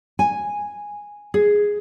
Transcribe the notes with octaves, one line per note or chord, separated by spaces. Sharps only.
G#5
G#4